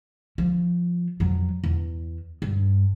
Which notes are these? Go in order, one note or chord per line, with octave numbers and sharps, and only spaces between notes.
F3
F2 F#3
E2
G2